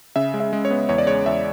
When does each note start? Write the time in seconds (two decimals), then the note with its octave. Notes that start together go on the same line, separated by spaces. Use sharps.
0.16 C#3 E5
0.34 G#3
0.40 E5
0.53 G#3
0.65 C#5
0.71 B3
0.89 E2 C#5
0.98 D5
1.07 G#3 C#5
1.26 E2 E5